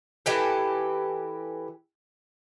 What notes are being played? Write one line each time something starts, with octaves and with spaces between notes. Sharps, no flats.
E3 G4 A4